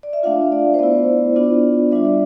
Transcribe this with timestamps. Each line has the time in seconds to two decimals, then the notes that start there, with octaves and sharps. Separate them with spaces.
0.03 D5
0.13 E5
0.23 A3 D4 F4 F5
0.52 D5
0.74 C5
0.79 B3 E4 D5
1.36 B3 D4 F4
1.92 G3 D4 F4 E5
2.05 D5